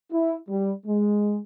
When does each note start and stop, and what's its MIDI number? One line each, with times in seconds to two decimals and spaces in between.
0.12 0.35 64
0.49 0.71 55
0.86 1.37 56